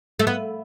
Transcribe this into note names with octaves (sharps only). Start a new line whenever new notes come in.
A3
B3